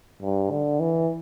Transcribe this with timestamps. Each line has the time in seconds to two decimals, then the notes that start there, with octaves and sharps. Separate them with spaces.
0.22 G2
0.51 D3
0.80 E3